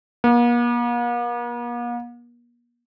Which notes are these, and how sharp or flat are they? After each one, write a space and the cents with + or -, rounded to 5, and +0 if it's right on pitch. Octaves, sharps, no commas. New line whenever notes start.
A#3 +45